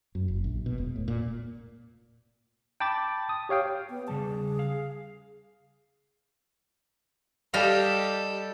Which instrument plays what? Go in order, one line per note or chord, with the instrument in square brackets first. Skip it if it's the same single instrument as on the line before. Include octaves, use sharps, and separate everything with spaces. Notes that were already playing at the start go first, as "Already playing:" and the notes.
[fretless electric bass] F#2
F#1
A#1
B2
E1
A2
A#2
[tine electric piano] G5 A5 B5 D6 A6
D#6
G4 C#5 F5 G5
[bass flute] B3
[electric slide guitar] C#3 G3 A5 [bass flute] G#4
[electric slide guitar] F5
[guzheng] G3 D#5 F5 [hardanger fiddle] G4 A4